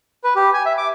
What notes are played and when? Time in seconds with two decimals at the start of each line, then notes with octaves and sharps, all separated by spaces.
0.24 B4
0.36 G4
0.54 G#5
0.66 E5
0.78 D6